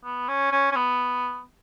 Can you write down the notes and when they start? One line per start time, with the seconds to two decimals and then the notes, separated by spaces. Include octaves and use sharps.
0.04 B3
0.28 C#4
0.52 C#4
0.72 C#4
0.76 B3